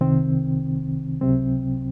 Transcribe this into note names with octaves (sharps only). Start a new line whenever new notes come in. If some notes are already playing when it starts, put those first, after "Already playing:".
C2 C3 D#3 C4
C#2 C3 F#3 C4